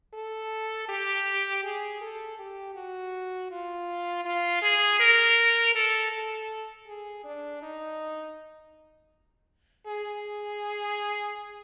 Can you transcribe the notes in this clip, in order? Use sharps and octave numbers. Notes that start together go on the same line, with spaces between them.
A4
G4
G#4
A4
G4
F#4
F4
F4
G#4
A#4
A4
A4
G#4
D4
D#4
G#4